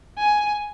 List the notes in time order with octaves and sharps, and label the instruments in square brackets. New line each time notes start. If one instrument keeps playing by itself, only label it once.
[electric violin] G#5